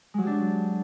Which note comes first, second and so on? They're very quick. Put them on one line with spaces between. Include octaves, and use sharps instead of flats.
G#3 F#3 G4 D4